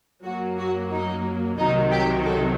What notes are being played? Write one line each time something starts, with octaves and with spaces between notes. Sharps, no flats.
F#2 F#3 A#3 F#4
F#4
D#4
C2 C3 D#3 F#3 D#4
G4
A4